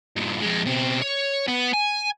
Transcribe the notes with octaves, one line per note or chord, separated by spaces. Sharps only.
G2 A#2
F2 G#3
B2 C4
C#5
B3
G#5